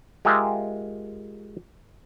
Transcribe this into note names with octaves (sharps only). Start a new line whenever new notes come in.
G#3 F4 G4 A#4 E5